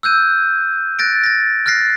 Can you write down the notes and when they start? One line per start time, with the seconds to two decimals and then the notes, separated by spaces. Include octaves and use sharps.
0.03 E6 F#6 G6 D#7
0.99 F#6 A6 A#6 D7
1.24 A6 A#6
1.66 F6 F#6 A6 A#6 C7